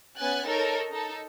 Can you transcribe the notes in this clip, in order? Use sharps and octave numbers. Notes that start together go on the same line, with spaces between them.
B3 C#4 G#5 F#6 A6
D#4 A4 A#4 C#5
D#4 A4